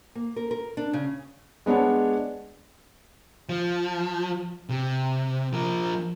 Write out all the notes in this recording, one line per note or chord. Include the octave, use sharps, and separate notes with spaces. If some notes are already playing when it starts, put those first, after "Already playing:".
A#3
A#4
A#4
D4
C#3
G#3 B3 D4 C#5 A5
F3
C3
F3 A#4